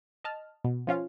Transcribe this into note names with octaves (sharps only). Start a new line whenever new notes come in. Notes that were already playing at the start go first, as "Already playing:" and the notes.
D#5 A5 F6
B2
F3 C#4 F4 F5